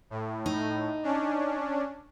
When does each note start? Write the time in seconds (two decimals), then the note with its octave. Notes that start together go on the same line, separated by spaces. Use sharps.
0.10 A2
0.46 D#4
1.03 C#4 D4